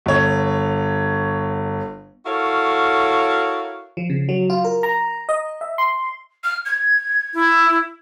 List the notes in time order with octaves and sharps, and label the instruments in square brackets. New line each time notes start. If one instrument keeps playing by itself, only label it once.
[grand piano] G1 C#5
[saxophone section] E4 F#4 A4 A#4 C#5 F5
[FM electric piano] F3
C#3
F#3
F4
A#4
A#5
D#5
E5
C6
[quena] F6
G#6
[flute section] E4